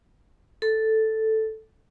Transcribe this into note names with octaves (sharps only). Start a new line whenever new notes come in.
A4